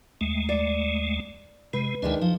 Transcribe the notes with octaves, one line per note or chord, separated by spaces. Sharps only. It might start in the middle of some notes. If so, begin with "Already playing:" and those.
D#2 G#3 A3
D5
C3 G#3 B4
D2 D#3 G#3 D4 E5 G#5
F3 D#4